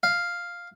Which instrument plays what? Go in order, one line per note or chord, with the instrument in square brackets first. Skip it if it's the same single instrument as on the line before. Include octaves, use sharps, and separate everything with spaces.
[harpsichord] F5